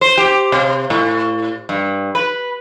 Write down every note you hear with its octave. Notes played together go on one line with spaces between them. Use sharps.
C5
G4
C3
A2
G2
B4